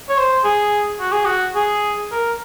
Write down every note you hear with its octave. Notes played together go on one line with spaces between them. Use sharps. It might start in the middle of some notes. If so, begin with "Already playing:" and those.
C#5
C5
G#4
F#4
G#4
F#4
G#4
A#4